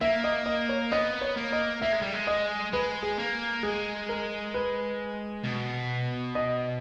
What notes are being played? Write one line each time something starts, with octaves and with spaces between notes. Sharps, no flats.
A#3 E5
D#5
D#5
C#5
B3 D#5
C#5
A#3
D#5
A#3 E5
G#3
G3
G#3
D#5
G#3 B4
G#4
A#3
G#3 G#4
A#4
B4
B2
D#5